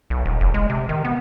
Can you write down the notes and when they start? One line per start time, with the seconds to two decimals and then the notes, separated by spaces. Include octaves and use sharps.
0.10 B1
0.25 D#1
0.41 F#1
0.54 G#3
0.70 C3
0.89 D#3
1.05 B3